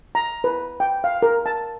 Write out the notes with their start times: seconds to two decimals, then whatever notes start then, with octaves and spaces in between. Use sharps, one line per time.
0.15 A#5
0.44 B4
0.80 G5
1.04 F5
1.23 A#4
1.46 A5